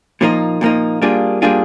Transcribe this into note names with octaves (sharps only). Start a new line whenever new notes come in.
A#2 F3 A#3 D#4
A#2 F3 A#3 D#4
G3 A#3 D4 F4 G#4
G3 A#3 D4 F4 G#4